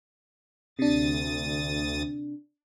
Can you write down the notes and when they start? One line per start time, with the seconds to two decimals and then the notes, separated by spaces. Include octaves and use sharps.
0.79 D2 C3 D4 D#6 A6